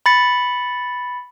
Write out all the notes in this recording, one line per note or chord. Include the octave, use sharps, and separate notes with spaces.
B5 A6 C#7